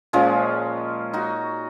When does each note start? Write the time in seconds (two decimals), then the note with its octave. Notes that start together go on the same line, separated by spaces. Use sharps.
0.13 A#2 F3 G#3 C#4 F4
1.13 D#4 F#4